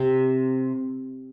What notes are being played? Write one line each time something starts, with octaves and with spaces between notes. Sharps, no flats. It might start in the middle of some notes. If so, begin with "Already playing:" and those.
Already playing: C3